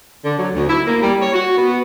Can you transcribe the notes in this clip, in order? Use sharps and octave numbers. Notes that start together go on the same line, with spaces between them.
D3
F#3
D2
E4
A#3
G3
C#5
F#4
B3